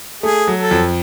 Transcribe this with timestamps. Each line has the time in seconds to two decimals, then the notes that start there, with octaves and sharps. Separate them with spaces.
0.23 A3 G#4
0.48 F#3
0.59 A4
0.71 F2